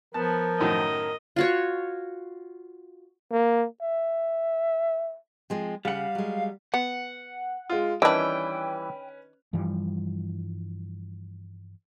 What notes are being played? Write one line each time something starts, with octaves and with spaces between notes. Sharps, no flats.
F3 B3 A#4 A5
F#2 A2 D#3 D#5
F4 F#4 C#5
A#3
E5
F3 G#3 C4
C#3 G3 F5 F#5
F#3 G#3
B3 F#5
G#3 F4
D#3 E3 G3 C#4 D4 E4 B4 G5
G2 E3 F3 G3